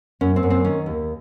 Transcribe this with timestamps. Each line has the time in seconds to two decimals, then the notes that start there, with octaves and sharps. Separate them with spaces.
0.21 F#2 C#4
0.36 C4
0.43 F#2
0.50 C4
0.65 D#3 C#4
0.86 D#2